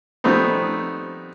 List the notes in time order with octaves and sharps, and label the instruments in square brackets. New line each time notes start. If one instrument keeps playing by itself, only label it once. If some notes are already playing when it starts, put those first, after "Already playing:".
[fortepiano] F3 G3 A3 B3 C4 D#4